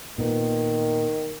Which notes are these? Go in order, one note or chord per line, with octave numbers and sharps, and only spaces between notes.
A#2 D#3 B3